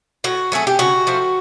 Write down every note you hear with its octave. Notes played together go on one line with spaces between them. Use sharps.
A2 F#4
F#3 A3 G#4
G4
C#3 F#4
F3 A3